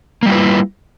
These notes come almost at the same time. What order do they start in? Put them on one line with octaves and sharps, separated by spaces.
A#3 G3 F4 B4 E4